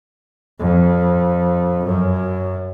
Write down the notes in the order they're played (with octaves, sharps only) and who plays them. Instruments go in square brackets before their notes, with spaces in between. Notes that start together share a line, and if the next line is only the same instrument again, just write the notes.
[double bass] F2
F#2